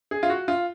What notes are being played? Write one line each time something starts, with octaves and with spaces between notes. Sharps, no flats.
G#4
F4
F#4
F4